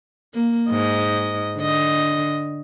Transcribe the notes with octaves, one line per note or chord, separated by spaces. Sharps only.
A#3
G#2 D#5
D3 D#5